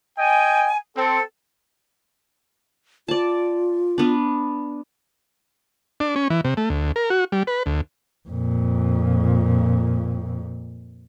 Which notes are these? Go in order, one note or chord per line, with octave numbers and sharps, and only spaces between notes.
D#5 G5 G#5
C4 A4
F4 D5 A5
B3 D4
D4
C#4
E3
C3
A3
D2
A#4
F#4
G3
B4
D2
F2 A#2